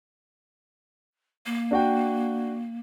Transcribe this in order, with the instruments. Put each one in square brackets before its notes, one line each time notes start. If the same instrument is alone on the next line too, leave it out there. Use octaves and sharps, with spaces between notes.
[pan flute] A#3
[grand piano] D4 F#4 G5